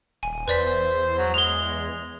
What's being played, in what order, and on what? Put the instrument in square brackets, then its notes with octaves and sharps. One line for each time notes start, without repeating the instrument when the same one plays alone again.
[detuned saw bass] D#1 [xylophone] G#5
[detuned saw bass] E2 [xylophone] B4 D5 B6 [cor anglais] C5
[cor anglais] F#3
[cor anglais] G#3 [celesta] F7 G7